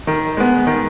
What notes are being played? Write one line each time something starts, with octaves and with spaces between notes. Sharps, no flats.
D#3
G#3 B3
D#3